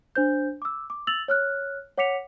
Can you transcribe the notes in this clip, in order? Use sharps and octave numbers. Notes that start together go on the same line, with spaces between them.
D4 C5 G6
D6 E6
D6
E6 A6 F7 F#7
C#5 F6 F#6
C#5 F#5 D6 B6 C#7 F7